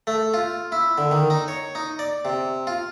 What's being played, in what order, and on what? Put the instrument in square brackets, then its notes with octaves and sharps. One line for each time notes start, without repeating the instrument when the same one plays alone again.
[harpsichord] A3
F4
E4
D3
D#3
D#4
C#5
D#4
D5
C3
F4